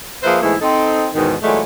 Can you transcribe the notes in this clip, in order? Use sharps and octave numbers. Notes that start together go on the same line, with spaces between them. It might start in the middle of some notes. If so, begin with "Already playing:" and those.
F3 A#3 G#4 B4 C5 E5
G#2 E3 G#3 A3 B3 E4
C4 D#4 A4
E2 G#2 B2 D#3
A#2 E3 F#3 G#3 A3